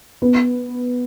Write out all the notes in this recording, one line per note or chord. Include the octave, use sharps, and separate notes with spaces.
B3